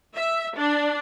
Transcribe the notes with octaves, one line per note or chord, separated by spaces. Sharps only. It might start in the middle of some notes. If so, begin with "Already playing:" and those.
E5
D4